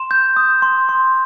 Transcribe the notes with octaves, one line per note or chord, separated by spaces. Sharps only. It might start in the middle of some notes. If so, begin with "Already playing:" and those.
Already playing: C6 E7
G6
D#6
C6
C6